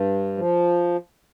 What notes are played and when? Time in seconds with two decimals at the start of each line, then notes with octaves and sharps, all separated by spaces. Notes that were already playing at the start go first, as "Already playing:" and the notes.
Already playing: G2
0.37 F3